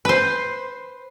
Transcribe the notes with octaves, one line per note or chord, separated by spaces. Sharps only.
B4 C5